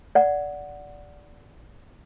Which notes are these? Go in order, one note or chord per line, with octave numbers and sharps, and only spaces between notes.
D5 F#5